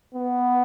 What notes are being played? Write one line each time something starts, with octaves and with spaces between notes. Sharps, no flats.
B3